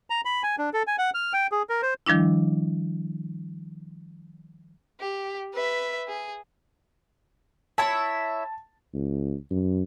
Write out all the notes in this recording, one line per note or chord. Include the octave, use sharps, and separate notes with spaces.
A#5
B5
G#5
D4
A4
G#5
F#5
F6
G5
G#4
A#4
C5
D#3 F3 G3 D4 E4
G4
B4 E5
G#4
E4 C#5 E5 A5
C#2
F#2